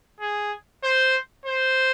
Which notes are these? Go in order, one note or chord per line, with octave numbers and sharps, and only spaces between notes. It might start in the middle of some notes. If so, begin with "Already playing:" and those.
G#4
C5
C5